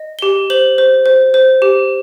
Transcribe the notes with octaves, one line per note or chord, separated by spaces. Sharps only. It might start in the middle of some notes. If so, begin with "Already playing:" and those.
Already playing: D#5
G4 G7
C5 F#7
C5
C5
C5
G4